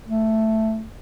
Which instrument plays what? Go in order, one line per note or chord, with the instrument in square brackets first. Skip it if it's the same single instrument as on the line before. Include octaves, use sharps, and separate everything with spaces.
[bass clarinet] A3